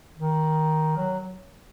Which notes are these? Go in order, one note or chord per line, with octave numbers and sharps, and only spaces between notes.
D#3
F#3